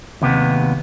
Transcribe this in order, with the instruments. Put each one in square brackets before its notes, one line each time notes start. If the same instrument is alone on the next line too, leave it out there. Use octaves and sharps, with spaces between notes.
[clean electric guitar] D#2 C3 B3